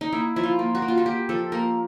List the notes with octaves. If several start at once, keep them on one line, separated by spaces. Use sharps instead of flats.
D#4
A#3 E4
F3 E4
F4
A#3
F#4
A#3
F4
F#4
A#3 G4
F3 A4
A#3 A#4